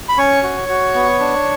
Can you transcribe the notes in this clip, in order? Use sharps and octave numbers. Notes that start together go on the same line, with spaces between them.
B5
C#4 C#5 C#6
F#4
F#4
B3
D4